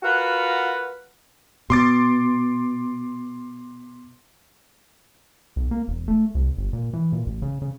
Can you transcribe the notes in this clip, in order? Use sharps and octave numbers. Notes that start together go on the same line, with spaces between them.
F4 F#4 A#4 B4 F#5
B2 C6 D6 A6
B1
A#3
E1
A3
C2
G1
A#2
E3
A#2
A1
C#3
C#3